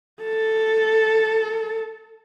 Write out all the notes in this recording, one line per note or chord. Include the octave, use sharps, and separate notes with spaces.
A4